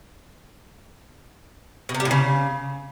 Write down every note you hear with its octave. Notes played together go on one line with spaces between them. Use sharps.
B2
C3
G3
A2
C#3